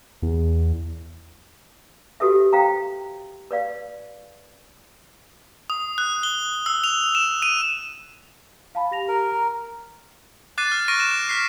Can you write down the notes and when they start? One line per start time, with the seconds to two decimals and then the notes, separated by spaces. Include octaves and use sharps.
0.22 E2
2.20 F#4 G4 A4 B4 E5
2.53 C5 F5 G5 A#5
3.51 B4 D5 F5
5.70 D#6
5.98 F#6
6.23 G7
6.66 E6
6.84 F7
7.15 E7
7.42 D#7
8.75 F5 A5 B5
8.91 G4 A#6 F7
9.08 A#4
9.31 A#5
10.58 D6 F#6 A6 C7 D#7
10.72 F6
10.88 C#6 F6 A#6 D7 D#7
11.00 E7
11.11 F#6
11.29 F6 B6 C7